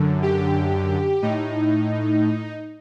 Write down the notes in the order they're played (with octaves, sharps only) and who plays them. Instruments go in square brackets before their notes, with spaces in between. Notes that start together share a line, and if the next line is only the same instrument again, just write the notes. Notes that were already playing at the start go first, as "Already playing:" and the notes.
Already playing: [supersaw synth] F#2 D3
G4
A2 D#4